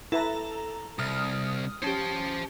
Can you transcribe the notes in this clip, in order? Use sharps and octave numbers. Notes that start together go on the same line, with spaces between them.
E4 A4 B4 A#5
C2 D#6 F6
C#4 G4 C5 A5